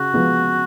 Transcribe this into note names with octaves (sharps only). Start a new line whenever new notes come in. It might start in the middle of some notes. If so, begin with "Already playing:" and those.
Already playing: C#3 F#4
F3 G#3 B3